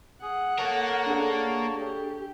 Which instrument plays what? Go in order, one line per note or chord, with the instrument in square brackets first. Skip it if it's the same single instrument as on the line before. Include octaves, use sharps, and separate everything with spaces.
[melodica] G#4 [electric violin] F#5
[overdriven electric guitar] A#3 A#4 [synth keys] A4 [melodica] C#5 A5
[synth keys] D4 G#4 A4
[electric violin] G4